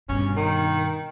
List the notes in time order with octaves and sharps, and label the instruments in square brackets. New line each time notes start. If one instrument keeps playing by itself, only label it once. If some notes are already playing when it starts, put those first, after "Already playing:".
[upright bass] G2 B2 [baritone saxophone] C#4
[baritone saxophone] D#3